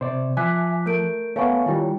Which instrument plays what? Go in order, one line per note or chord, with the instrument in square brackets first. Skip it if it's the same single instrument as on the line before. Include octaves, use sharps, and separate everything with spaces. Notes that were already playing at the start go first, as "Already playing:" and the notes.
[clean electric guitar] C3 [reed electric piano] C5 D5
[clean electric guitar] F3 [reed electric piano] E5 G#5 [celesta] D6 F#6 B6
[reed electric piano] A3 [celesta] A#4 G6 D7
[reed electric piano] A3 B3 [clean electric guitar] C#5 [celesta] F5 G#5 C#6
[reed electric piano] D#3 G3 [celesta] E4 F4 G5